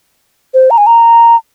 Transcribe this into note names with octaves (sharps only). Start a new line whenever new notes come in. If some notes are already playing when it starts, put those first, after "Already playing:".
C5
A#5
G#5
A#5